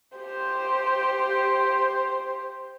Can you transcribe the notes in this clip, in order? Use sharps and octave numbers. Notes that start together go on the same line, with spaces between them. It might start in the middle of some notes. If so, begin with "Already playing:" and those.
G4 C5